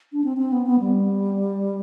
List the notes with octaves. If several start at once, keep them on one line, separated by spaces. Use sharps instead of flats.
D4
C4
C4
B3
B3
G3